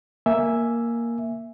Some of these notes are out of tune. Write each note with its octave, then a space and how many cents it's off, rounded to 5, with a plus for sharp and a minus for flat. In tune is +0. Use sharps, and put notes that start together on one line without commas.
A#3 +0 E5 +0 G#5 +0